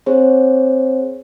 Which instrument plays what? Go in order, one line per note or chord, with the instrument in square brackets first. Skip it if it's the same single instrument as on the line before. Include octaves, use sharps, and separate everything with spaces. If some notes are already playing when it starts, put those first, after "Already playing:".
[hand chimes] C4 G#4 C5 C#5